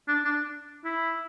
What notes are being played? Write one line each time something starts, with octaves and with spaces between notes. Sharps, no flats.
D4
D4
E4